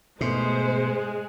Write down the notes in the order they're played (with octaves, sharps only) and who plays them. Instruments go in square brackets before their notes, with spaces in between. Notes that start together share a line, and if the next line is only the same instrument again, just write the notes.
[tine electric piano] G#2 A3 C6 [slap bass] B2 [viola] G#3 [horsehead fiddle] C5